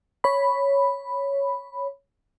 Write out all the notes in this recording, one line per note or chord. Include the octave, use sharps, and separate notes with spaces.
C#5 B5